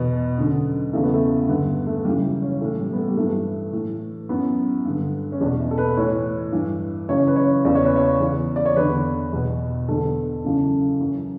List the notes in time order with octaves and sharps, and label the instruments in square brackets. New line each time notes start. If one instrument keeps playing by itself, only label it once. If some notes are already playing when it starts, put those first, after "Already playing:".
Already playing: [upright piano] E2 B2 B3
F#2 D3
E2 C#3 E3 A3
B3
A3
G2 D3 B3
A3
F#2 C#3 E3 G3
C#4
A2 E3 A3
G3
B3
A3
G3
G2 E3 A3
A2 E3
F#2 E3 B3
G2 D3
C#4
E2 D4
B2
E4
A4
B4
A2 E3 C#5
G2 E3
F#2 C#3 E3 C#5
B4
C#5
E2 C#3 E3 D5
C#5
B4
C#5
E2 C#3 E3
D5
C#5
E2 D3 B4
E2 B2
E2 D3 A4
F#2 C#3 E3
F#2 E3